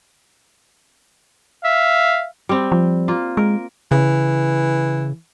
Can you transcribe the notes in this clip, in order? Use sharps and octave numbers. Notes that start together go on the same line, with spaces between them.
E5 F5
G3 C4
F3
A#3 F4
G#3 A#4
C#3 E3